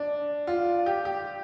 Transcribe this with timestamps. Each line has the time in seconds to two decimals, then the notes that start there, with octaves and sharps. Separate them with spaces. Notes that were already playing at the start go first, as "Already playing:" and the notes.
Already playing: D4
0.47 F4
0.86 G4
1.05 G4